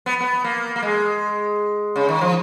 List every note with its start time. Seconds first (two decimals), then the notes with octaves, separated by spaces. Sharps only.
0.06 B3
0.21 B3
0.44 A#3
0.76 A#3
0.82 G#3
1.96 C#3
2.08 D#3
2.21 F3